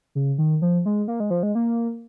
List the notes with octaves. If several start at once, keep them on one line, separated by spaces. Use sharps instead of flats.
C#3
D#3
F3
G#3
A#3
G#3
F3
G#3
A#3